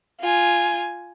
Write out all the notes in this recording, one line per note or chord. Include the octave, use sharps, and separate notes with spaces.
F4 G#5